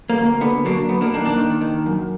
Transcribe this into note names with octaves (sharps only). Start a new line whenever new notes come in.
A#3
D2
A#3
D3 B3
F#3 A#3 D4
F#2 B3
A#3 D4
D#3 A#3 D4
A#3 D4
D#3
D#3
F#2